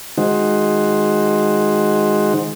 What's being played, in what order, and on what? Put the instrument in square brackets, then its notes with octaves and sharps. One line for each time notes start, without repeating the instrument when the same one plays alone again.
[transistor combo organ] D#3 G#3 D#4 F#4 C5